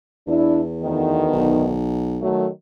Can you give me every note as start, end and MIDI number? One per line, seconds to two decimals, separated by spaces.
0.27 1.28 40
0.27 0.61 62
0.27 0.61 64
0.81 1.74 38
0.81 1.74 51
0.81 1.74 59
1.33 2.25 35
2.22 2.48 51
2.22 2.48 54
2.22 2.48 57